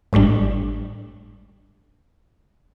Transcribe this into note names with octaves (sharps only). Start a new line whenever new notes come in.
G#1 A2 G3 D4